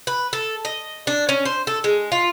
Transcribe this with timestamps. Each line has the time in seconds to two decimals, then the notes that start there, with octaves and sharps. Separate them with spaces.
0.07 B4
0.33 A4
0.65 D#5
1.07 D4
1.29 C#4
1.45 C5
1.67 A4
1.84 G#3
2.12 F4